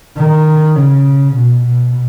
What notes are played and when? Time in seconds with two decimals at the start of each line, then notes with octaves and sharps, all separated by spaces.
0.17 D#3
0.76 C#3
1.36 B2
1.65 B2